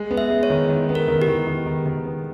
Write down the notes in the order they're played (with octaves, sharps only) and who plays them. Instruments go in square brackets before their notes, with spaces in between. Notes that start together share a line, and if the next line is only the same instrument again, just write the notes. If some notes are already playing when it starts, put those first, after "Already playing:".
Already playing: [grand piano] G#3
B3
[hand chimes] E5
[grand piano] G#3
[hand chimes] C#5
[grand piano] D#3
D#3
B3
[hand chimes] A#4
[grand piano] D#3
[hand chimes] G4
[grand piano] D#3
D#3
D#3
D#3
B3